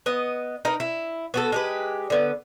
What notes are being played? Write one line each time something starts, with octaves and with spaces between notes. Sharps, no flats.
B3 D#5
D#4 A#4 B4
E4
B3 F#4 A4
G#3 G4 B4
D3 B3